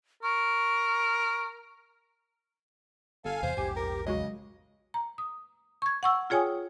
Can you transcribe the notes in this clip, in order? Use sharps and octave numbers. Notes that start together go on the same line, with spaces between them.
A#4 C#6
G1 A4 F5 G#5
E2 C3 E3 C5
A#1 E2 G#2 G4 G#5 G#6
A#4
C#3 F#3 G#3 F#4 D#5
A#5
D#6
C#6 G#6
F#5 C#6 E6
F4 G#4 C#5 G5 G#5 D#6